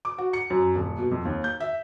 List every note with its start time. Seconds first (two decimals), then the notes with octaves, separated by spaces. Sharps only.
0.05 D6
0.18 F#4
0.33 C#7
0.50 F#2
0.75 D#1
0.98 B2
1.12 F2
1.25 D#2
1.44 G6
1.60 E5